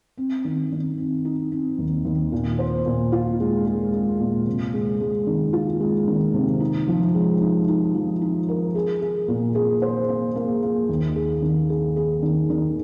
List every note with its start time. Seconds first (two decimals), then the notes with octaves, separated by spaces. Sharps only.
0.17 C4
0.45 D#3
0.72 D#3
0.98 C4
1.25 D#4
1.52 C4
1.78 D#2
2.05 D#2
2.32 A#2
2.59 C5
2.86 A#2
3.12 F4
3.40 G#3
3.66 G#3
3.92 G#3
4.20 A#2
4.47 C3
4.74 G#3
5.01 G#3
5.27 D#3
5.53 F4
5.80 G#3
6.08 D#3
6.34 C3
6.60 D#4
6.88 F3
7.15 G#3
7.41 D#4
7.68 D#4
7.95 F3
8.22 D#4
8.48 A#4
8.75 G#4
9.01 G#4
9.28 A#2
9.55 G#4
9.82 C5
10.09 A#3
10.36 A#3
10.63 A#3
10.89 D#2
11.16 G#4
11.42 D#3
11.70 G#4
11.96 G#4
12.22 D#3
12.50 D#3